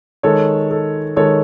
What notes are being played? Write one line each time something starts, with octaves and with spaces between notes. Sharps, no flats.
D#3 G#3 A4 C#5
A4
D#3 G#3 A4 C#5